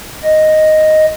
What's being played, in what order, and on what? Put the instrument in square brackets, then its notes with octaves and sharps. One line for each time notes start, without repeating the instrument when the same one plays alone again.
[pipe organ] D#5